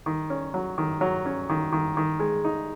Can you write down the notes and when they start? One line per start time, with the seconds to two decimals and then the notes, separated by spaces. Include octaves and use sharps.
0.06 D#3
0.30 C#4
0.54 F#3
0.78 D#3
1.01 F#3
1.26 C#4
1.49 D#3
1.72 D#3
1.97 D#3
2.20 G#3
2.45 D#4